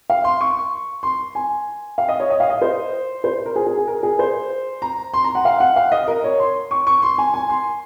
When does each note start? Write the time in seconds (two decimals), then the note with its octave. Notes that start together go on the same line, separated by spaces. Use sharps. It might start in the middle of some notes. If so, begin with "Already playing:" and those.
0.10 F5
0.24 C6
0.41 C#6
1.03 C6
1.35 G#5
1.98 F5
2.09 D#5
2.20 C#5
2.30 D#5
2.40 F5
2.50 D#5
2.62 C5
3.24 C5
3.46 A#4
3.56 G#4
3.67 G#4
3.77 G#4
3.88 A#4
4.03 G#4
4.19 C5
4.82 A#5
5.14 C6
5.24 A#5
5.35 F#5
5.45 F5
5.60 F#5
5.76 F5
5.92 D#5
6.08 A#4
6.24 C#5
6.40 C6
6.71 C#6
6.87 C#6
7.02 C6
7.18 G#5
7.34 G#5
7.50 C6